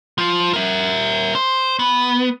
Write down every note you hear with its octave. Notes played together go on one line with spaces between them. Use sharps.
F3 F4
A#4 E5
C5
B3